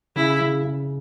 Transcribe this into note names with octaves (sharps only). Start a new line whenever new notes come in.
C#3 E4
C#3
C#3